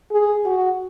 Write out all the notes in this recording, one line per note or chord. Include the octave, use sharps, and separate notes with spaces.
G#4
F#4